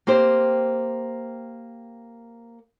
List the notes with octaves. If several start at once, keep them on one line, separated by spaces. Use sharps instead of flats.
A#3 C4 G4 C5